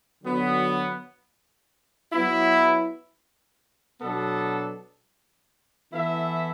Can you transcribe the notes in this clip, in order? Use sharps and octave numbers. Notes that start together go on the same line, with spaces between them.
D3 F#3 B3 F#4
F#3 B3 E4
B2 F#3 B3 D4 A4
E3 B3 E4 A4 E5